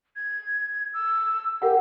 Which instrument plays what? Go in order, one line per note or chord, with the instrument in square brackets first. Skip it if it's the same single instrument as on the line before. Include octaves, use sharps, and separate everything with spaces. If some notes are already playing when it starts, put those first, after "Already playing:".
[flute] G#6
E6
[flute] G4 [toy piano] A#4 F5 F#5